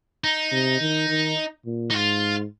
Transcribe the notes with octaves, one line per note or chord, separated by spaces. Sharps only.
D#4
C3
D#3
D#3
A#2
D#4
G#2 F4